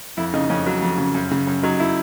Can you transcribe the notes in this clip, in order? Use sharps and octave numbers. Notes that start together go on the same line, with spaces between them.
F2 E4
C#3 D#4
F2 C#4
F#3
F2
C#3
F#2
C#3
F#2
F#3 D#4
E4